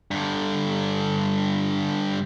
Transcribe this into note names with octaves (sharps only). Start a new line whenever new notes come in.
G2 D3